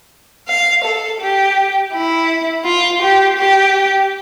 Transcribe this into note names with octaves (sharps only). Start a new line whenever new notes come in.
F5
A4
G4
E4
F4
G4
G4